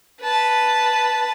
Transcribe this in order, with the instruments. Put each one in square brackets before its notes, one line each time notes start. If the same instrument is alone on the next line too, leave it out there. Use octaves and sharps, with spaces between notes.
[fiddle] B4 A5